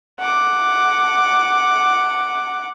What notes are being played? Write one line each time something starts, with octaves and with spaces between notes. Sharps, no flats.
F#5 D6